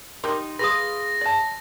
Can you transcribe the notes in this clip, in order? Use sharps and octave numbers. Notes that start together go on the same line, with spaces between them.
D#4 G4 A#4 C6
F4 G#4 B4 B5 C6 D#6 A#6
D5 A5